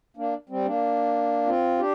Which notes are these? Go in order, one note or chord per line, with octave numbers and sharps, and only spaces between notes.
A#3 D4
G3 C4
A#3 D4
C4 F4
D4 G4